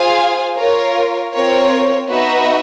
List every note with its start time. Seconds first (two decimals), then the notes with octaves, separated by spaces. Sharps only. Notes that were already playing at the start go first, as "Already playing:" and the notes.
Already playing: F4 G#4 C5 F5 G#5
0.57 F4 A#4 C#5
1.33 C4 F4 A#4 C#5
2.08 B3 D#4 F#4 B4 E5